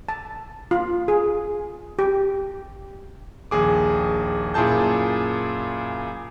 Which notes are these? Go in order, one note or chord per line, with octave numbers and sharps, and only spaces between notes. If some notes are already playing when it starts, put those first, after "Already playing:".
A5
F4
G#4
G4
A#1 D#2 G#4 D6
F#2 A#2 E4 G#4 A5 G6